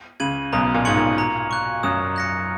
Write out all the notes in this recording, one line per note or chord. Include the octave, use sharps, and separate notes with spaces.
C#2 C#3 G#6 D#7 F#7
B1 B2 A#5
A#2
G#2 C#6 G#6 C#7 F#7
A#2
A#5
C#6 F#6
F#2 F#3 D#6
F#6 A#6 C#7